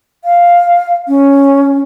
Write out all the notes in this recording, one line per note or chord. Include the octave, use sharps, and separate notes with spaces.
F5
C#4